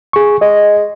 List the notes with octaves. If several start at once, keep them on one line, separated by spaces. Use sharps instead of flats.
G#4 C#6
G#3 D#5